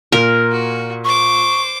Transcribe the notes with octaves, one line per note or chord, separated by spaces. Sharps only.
A#2 A#4
F#4
C5 C#6 D6